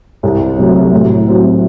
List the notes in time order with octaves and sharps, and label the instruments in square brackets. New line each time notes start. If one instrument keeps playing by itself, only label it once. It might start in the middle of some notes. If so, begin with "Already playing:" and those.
[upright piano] C2
C3 F#3 A3
A2
F#3 C4 F#4